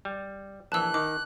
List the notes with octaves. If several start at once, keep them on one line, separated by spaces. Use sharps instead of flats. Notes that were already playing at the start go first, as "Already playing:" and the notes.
G3
A#1 E3 A5 E6 F#6
D#3 D6